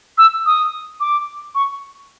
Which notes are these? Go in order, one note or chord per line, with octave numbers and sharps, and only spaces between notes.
E6
D#6
D6
C#6